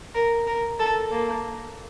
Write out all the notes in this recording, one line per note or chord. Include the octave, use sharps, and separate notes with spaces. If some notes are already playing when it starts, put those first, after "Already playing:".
A#4
A#4
A4
A#3